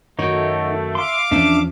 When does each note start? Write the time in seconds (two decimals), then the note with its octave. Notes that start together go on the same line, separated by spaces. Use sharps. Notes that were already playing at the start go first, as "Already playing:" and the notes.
0.19 F#2 D#3 A3 D#4 F#4 C#5
0.95 E5 F5 C6 D6
1.31 E2 F3 C#4 D4 E5